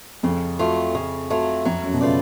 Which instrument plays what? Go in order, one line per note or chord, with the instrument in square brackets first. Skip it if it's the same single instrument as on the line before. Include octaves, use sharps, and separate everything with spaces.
[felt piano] F2 [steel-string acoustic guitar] C#3
[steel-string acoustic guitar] F#3 A3 F4
C#3
F#3 A3 F4
[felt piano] F2 [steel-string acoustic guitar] F#3
[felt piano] F#2
B2
[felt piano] C#3 [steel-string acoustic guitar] A3 F4 B4 D5